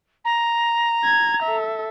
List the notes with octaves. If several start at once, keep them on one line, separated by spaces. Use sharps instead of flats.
A#5
G#6
A4 E5